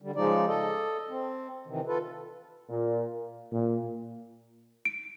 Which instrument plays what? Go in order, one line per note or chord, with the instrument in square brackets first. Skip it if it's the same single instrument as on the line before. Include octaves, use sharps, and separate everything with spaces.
[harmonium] D3 G3
C#3 F3 G#3 D#4 D5
A4 D#5
C4
C3 D#3 E3
F4 A4 B4
[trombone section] A#2
[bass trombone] A#2
[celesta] D7